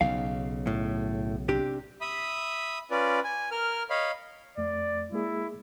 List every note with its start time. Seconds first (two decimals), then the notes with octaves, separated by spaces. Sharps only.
0.01 B1 C#3 F5
0.67 A2
1.48 C3 D4 G4
2.01 E5 B5 D#6
2.91 C#4 F4 B4 D5
3.24 G#5
3.51 A#4 F6
3.90 C#5 D#5 F5 B5
4.58 F2 A3 D5
5.12 G#3 A#3 E4 G#4